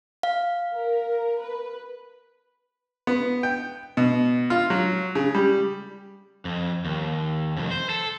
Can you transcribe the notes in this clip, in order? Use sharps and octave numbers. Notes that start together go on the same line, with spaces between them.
F5
A#4
B4
B3
G5
B2
F4
F#3
C#3
G3
F2
D#2
C2 F2
C5
A4